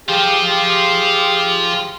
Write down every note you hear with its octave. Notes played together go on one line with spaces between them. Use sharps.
F4 G4 G#4 C5 F5